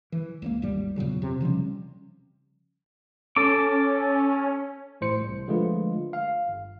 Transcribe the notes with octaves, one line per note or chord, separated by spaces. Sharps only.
E3
C#2 G3 A#3
G#1 D#2 G3
E2 A#2 C#3 F#3
C3
C#3 F3 G3 C#4
C#4 A4 D6
A1 A2 C5 C#7
C2
D3 F3 G#3 A3 F4 B4
F5
G1